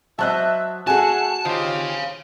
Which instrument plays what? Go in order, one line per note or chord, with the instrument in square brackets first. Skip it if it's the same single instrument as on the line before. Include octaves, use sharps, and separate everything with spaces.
[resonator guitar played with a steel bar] F#3 C5 D#5 [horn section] E5 [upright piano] A5 F#6
[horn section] A3 A4 F#5 [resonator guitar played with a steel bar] F#4 G#4 [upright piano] G#5 [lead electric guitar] A5
[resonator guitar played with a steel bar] D#3 [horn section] F4 G4 C5 [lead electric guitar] C#5 F5